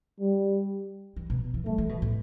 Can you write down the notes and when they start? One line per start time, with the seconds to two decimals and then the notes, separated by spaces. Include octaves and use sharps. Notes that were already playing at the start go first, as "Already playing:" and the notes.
0.20 G3
1.16 E3
1.30 B2
1.54 E3
1.66 G3 A3
1.78 E3
1.89 B2
2.02 A2